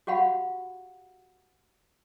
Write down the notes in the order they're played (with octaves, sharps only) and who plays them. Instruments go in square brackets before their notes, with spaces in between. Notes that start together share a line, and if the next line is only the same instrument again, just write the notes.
[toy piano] F#4 G4 F5 F#5 B5